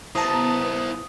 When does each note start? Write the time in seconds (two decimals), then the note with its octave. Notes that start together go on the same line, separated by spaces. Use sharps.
0.15 B3 E4 C5 A5 A#5 D#6